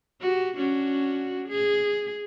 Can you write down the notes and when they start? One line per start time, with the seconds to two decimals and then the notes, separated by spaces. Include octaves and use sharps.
0.21 F#4 G4
0.57 C#4 D4 F#4
1.49 G#4